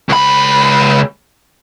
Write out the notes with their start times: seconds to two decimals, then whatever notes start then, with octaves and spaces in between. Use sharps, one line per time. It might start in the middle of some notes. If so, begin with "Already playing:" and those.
0.09 C#2 B5